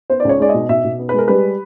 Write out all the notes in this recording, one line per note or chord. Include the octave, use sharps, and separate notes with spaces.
B3 C5
D5
C#2 C#5
G#3 D5
D#5
B2
B2 E5
B2
B3
B4
G#3 A#4
G3 B4